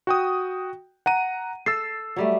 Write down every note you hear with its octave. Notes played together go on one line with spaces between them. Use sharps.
F#4 G5 D#6
F#5 A#5 D#7
A4 E6 A6 C7
F#3 G3 A3